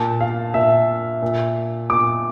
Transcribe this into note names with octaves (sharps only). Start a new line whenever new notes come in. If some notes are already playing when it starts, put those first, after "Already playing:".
Already playing: A#2 A5
F5
A#2 E5
A#2
A#2 D6